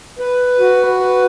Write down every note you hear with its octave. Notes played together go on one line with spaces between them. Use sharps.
B4
F#4
B4